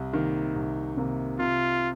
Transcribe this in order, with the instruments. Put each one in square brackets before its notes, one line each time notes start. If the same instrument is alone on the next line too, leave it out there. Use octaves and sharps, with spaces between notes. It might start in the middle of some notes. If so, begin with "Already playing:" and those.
Already playing: [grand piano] C2
C3 D#3 A#3
C2
C3 D#3 A#3
[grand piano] C3 [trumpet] F4